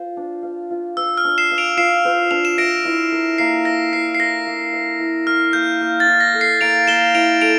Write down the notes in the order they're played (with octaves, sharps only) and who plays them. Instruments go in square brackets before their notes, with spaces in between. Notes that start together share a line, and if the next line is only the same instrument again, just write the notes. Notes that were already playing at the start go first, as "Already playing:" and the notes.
Already playing: [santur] F4 C5
D4
F5
F4
[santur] C5 [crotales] E6
[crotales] F6
[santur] D4
[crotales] C7 E7
[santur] F5
[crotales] D7 F7
[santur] F4 [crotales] C7 E7
[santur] C5
[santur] D4 [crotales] F7
[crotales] E7
[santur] E5 [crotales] A#6 D7
[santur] E4
A#4
[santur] A#3 [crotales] C7
[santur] E5 [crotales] A#6
[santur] E4 [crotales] C7
[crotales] C7
[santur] A#4 [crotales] A#6
[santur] A#3
E5
E4
[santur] A#4 [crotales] F6
[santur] A#3 [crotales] G6
[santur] A#3
[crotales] A6
[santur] E4
[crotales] A#6
[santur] A4
[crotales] C7
[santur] A#3 [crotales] D7 F7
[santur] A#3 [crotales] E7 G7
[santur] E4 [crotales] D7 F7
[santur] A4 [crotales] D7 F7